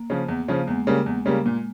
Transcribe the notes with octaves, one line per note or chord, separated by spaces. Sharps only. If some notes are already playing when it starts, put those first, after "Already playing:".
Already playing: A#3
C#3 F3
E2
C#3 F3
A#3
E2 G#3
C#3 G3 A#3
E2
C#3 G3 A#3
A#2